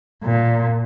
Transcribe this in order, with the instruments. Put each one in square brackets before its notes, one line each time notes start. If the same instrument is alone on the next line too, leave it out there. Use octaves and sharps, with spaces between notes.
[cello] A#2